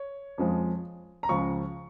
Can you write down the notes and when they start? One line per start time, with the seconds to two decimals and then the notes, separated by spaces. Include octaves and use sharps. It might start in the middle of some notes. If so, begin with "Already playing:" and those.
Already playing: C#5
0.38 F2 F3 G#3
1.23 A#5
1.29 C#2 C#3 F3 C#6